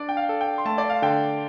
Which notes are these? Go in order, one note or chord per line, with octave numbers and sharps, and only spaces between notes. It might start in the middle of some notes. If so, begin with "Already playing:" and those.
Already playing: D4 D5
G5
F5
A4
G5
C6
A3 A5
D5
F5
D3 G5